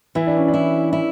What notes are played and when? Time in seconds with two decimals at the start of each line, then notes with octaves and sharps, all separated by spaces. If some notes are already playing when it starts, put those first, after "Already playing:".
0.15 E3 E4
0.27 D4
0.37 C#4
0.48 D4
0.54 E4
0.93 E4